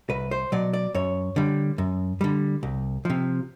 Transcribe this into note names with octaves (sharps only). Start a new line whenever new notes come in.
C2 B4
C5
B2 F#3 D5
D5
F#2 C#5
D3 G3
F#2
D3 G3
C2
C3 F3